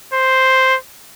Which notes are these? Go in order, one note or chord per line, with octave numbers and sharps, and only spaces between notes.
C5